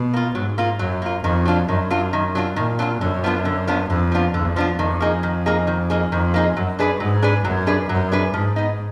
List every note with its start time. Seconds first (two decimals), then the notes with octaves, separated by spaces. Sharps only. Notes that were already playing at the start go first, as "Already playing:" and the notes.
Already playing: B2
0.14 A#3 F4
0.35 G#2 F#3
0.58 A#3 F4
0.79 F#2 F#3
1.02 A#3 F4
1.24 F2 D#3
1.45 F#3 D4 F4
1.68 F#2 D#3
1.90 F#3 D4 F4
2.13 D#3
2.35 F#3 D4 F4
2.56 A#2 D#3
2.79 F#3 D4 F4
3.01 F#2 D3
3.24 F3 B3 D4 F4
3.45 D3
3.67 F3 B3 D4 F4
3.90 F2 D3
4.12 F3 B3 D4 F4
4.34 F2 D3
4.56 F3 B3 D4 F4
4.78 F2 D#3
5.00 A#3 D#4 G#4
5.23 D#3
5.46 A#3 D#4 G#4
5.67 D#3
5.90 A#3 D#4 G#4
6.12 F2 D#3
6.34 A#3 D#4 G#4
6.56 F#2 F#3
6.79 D4 G#4 B4 D5
7.00 G#2 F#3
7.22 D4 G#4 B4 D5
7.44 F#2 F#3
7.67 D4 G#4 B4 D5
7.89 F#2 F#3
8.12 D4 G#4 B4 D5
8.34 G#2 F3
8.56 B3 D#4